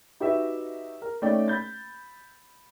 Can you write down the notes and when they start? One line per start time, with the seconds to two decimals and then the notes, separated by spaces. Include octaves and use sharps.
0.20 D#4 F#4 G4 B4 D#5 E5
1.02 A#4
1.22 A3 C#4 D#4 D5 G5
1.48 B5 G6 A6